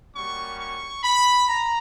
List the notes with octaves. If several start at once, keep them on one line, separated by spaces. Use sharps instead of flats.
G3 A#3 C#4 F#4 C#6
C#6
B5
A#5